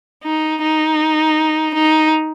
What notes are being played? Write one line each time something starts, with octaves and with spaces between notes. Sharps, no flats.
D#4
D#4
D#4